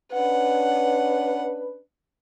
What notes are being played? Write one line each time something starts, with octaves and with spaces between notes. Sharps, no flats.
C#4 D4 B4 F#5